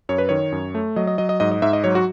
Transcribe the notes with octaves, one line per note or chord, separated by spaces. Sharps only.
F#2 C#5
B4
D#3 C#5
F#2
A3
F#3 D#5
D#5
F#3 D#5
D#5
G#2 D#5
D#5
G#2 E5
D#5
F#3 C#5
F#4